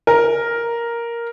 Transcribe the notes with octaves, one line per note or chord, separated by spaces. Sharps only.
A#4